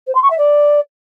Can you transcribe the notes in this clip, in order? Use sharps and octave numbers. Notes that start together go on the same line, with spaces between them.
C5
C6
C#6
E5
D5